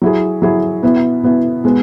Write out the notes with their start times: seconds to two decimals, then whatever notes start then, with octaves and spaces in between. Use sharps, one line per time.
0.02 F#3 E4 G#4
0.42 F#3 E4 G#4
0.82 B2 B3 E4
1.23 B2 B3 E4
1.64 B2 G#3 B3